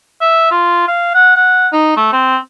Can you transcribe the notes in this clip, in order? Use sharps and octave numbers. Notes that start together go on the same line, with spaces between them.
E5
F4
F5
F#5
F#5
D#4
A3
C4